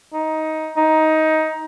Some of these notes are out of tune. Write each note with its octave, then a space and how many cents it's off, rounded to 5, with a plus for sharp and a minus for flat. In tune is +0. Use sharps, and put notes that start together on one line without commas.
D#4 +15
D#4 +15